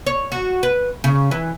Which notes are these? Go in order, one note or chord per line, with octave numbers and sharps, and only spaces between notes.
C#5
F#4
B4
C#3
E3